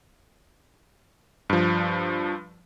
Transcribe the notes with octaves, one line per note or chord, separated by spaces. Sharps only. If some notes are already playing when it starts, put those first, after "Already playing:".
G2 F3